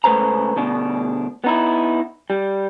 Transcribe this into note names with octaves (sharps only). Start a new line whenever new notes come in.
C#2 A3 B4 C5 A#5
D2 B2 D4
B3 D#4 E4
G3